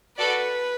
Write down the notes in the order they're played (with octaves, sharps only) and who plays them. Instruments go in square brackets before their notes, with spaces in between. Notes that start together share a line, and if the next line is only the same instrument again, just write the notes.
[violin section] F#4 A4 D5 [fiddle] B4